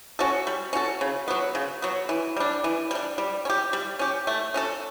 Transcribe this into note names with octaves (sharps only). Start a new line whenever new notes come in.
C#4 F#4 A4
G3
C#4 F#4 A4
C#3
F#3 B3
C#3
F#3 B3
E3
G3 D4
E3
G3 D4
G3
C#4
G4
G3
C#4 G4
A3
C#4 F#4 A4